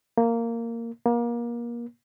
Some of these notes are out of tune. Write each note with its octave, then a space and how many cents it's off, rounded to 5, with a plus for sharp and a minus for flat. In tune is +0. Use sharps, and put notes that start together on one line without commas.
A#3 -10
A#3 +30